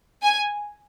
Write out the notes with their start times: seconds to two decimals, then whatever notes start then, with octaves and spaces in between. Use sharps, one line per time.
0.22 G#5